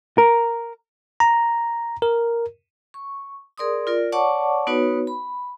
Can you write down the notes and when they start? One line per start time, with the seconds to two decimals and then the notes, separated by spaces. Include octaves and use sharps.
0.18 A#4
1.20 A#5
2.02 A#4
2.94 C#6
3.58 G#4 A#4 D5 C6 D#6
3.87 F4 A#4 D5
4.12 C#5 D5 F#5 A5 C#6 D6
4.67 B3 D#4 F#4 B4 C#5
5.07 B5